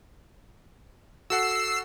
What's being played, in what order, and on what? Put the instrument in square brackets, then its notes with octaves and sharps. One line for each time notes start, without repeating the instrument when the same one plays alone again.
[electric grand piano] F#4 A4 F#5 [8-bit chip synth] E6 C7